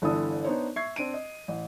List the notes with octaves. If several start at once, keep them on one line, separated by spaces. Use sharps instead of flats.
G1 D3 E3 E4 A4 D#6
B3 D4 D#4 C5 C#5
E5 C#6 G#6 C7
C4 D4 D7 D#7
D#5
A1